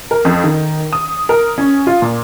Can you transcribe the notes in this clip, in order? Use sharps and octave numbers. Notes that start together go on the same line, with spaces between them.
A#4
F2
D#3
D#6
A#4
C#4
F4
A#2